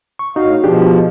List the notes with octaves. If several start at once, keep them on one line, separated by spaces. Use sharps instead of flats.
C#6
A2 D#4 F#4 F5
B2 F3 D4 G4 G#4